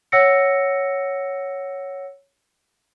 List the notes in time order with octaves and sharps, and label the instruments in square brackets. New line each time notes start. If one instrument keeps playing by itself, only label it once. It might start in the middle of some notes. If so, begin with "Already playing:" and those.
[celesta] C#5 F#5 E6 A#6 C#7